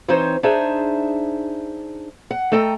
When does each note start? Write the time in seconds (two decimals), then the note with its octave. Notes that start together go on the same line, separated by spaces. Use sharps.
0.08 E3 C4 D#4 C5 C#5
0.43 D4 D#4 G#4 C5 E5
2.31 F#5
2.52 A3 A4 D#5 G5 A#5